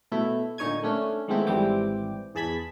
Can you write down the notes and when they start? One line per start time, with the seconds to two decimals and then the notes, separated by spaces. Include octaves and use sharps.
0.12 B2 A3 E4
0.58 A#2 D3 D#4 C#5 G#5 G#6
0.83 A3 C#4 D4
1.28 D#3 G#3 A3 B3 C4 E4
1.47 G#1 E3 G3 C4 G5 D6
2.35 E2 G#4 A5 B5 G#6 B6